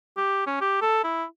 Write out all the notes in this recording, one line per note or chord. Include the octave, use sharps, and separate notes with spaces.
G4
C#4
G4
A4
E4